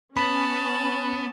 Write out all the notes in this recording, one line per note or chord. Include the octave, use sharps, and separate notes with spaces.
B3 C#4 A5 B5